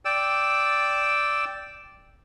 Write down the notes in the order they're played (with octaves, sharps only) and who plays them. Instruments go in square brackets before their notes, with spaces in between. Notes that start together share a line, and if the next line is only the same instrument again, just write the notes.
[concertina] D5 G5 E6